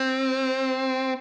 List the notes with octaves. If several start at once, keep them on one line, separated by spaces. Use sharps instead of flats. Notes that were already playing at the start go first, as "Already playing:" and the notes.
Already playing: C4